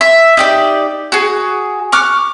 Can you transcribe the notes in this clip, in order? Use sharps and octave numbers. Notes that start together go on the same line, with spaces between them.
E5
D#4 G4 D5
F#4 G#4
C#6 D6 F6 F#6